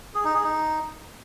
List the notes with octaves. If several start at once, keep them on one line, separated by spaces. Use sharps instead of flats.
G#4
D#4
G#4
D#4